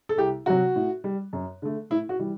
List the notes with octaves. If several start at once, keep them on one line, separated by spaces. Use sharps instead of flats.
A4
C2 G4
C3 F#3 F#4
A2
G3
F#2
D3 A3
A2 E4
F#4
E3 G3